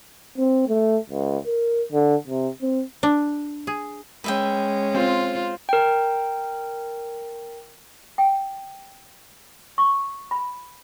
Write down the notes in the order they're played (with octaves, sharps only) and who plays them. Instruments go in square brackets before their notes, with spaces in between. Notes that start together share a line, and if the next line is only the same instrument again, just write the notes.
[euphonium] C4
A3
C#2
A#4
D3
C3
C4
[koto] D4
G#4
[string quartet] G#3 C#4 [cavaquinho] B4 E5 G5
[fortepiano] C4 [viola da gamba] F4
[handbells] A#4 G5
[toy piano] G5
C#6
B5